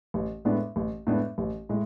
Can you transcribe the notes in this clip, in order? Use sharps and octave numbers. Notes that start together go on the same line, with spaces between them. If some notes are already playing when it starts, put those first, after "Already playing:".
A1
A2 G#3 B3 D4
A1
A2 G#3 B3 D4
A1
A2 G#3